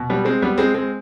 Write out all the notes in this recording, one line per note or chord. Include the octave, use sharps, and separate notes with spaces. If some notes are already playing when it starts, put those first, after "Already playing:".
Already playing: B2
G3 B3
G#3 C4
G3 B3
G#3 C4
G#3 C4